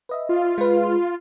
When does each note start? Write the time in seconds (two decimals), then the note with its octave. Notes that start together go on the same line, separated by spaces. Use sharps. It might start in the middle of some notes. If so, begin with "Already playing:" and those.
0.09 B4 D#5 E5
0.29 F4
0.58 G#3 B4